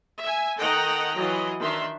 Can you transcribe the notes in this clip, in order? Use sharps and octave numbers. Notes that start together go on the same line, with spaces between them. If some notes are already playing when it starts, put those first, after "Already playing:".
E5 G#5
D#3 A4 D#5 F#5 G5 A#5
E3 F#3 F4 D#5
D#3 D4 E5 C6